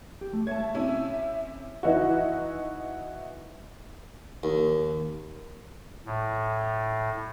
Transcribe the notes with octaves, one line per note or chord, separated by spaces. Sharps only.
G4
A3
C#5 E5 A5 G#6
C3 C#4 E4
E3 D#4 E4 F#4
D#2
A2